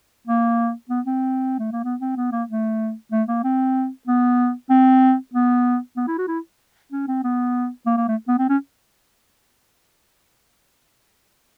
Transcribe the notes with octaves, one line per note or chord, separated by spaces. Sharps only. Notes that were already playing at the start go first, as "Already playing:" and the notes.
A#3
B3
C4
A3
A#3
B3
C4
B3
A#3
A3
A3
A#3
C4
B3
C4
B3
B3
E4
F#4
E4
C#4
C4
B3
A#3
A#3
A3
B3
C4
C#4